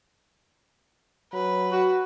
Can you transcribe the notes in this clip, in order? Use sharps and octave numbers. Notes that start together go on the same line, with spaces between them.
F#3 B4
F#4